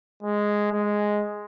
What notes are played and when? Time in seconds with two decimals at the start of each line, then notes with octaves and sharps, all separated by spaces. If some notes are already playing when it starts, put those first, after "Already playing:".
0.23 G#3
0.72 G#3